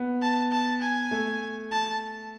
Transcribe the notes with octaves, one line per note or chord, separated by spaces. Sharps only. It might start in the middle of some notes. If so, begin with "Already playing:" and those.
Already playing: B3
A5
A5
G#5
A3
A5